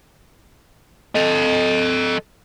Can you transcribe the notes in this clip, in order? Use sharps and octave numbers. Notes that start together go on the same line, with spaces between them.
A4 D#5